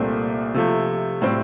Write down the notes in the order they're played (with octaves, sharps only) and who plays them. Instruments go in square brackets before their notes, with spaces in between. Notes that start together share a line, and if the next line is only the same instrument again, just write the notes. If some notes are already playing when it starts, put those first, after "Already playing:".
Already playing: [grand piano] C2 A#2 A3 C4
C3 F3 A3
A2 G3 C4